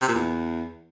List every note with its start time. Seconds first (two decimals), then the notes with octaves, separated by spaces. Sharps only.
0.02 C3
0.08 A#2
0.15 E2